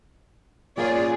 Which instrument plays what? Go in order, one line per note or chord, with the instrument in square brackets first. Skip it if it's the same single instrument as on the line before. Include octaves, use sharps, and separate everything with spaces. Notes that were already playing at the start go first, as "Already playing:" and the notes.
[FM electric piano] A#2 A#3 C#4 [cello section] F4 G#4 D5